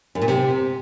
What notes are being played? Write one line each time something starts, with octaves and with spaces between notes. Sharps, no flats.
F#2
A#2
C3